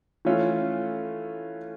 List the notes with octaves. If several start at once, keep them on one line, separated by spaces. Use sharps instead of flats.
E3 A3 C#4 F4